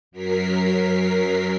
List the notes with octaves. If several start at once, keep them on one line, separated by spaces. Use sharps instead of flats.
F#2 F#3 A#4 B6 C7